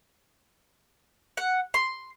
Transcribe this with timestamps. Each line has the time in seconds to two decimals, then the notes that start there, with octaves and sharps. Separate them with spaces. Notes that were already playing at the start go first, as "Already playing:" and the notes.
1.37 F#5
1.74 C6